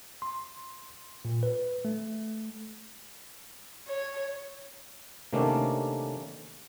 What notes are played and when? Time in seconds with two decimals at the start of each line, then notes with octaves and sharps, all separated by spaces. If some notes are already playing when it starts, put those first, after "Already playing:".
0.22 C6
1.25 A#2
1.43 B4
1.85 A3
3.88 C#5
5.33 C3 D#3 A3 A#3 C#4 D4